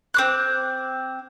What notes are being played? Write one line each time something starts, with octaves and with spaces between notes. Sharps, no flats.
C4 D6 F#6